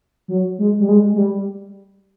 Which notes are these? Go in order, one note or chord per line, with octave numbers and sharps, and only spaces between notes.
F#3
G#3
G3
G#3
G#3
G3